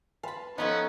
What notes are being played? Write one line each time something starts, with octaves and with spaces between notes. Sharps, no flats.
B4 F5 A5 B5 C6
F3 B3 C#4 D#4 F4 A4 B4